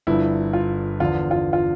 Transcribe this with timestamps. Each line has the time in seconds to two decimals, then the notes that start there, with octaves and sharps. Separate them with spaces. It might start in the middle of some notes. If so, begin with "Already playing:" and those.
0.07 G1 G2 F3 E4
0.53 F4
1.00 E2 D3 F3 F4
1.31 F4
1.53 F4